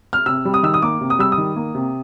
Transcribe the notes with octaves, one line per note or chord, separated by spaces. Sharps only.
F6
C3 E6
G3
D#6
D#3 E6
D#6
A#3 D6
C3
D#6
G3 E6
D#6
D#3
A#3
C3